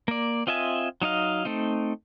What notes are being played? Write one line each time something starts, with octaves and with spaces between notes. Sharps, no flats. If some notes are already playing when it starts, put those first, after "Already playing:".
A#3 D5
C4 F4 D#5 E5 G#5
F#3 D#4 D#5 F5
A3 C4 D#4